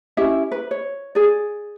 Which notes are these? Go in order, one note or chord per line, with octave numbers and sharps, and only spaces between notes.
C#4 E4 G4 E5
B4
C#5
G#4 D5